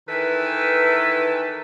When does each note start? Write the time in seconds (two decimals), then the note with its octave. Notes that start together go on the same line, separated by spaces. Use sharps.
0.08 D#3 E3 A4 B4